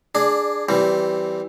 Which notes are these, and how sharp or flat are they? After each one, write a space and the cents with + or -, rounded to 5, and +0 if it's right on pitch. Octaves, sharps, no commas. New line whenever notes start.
D4 +0 G#4 +0 D5 +25
E3 +0 G3 -20 C4 +0